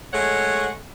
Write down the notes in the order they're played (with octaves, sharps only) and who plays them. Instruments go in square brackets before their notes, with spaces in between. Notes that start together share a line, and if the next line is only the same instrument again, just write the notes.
[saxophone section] G#3 A3 C#5 F#5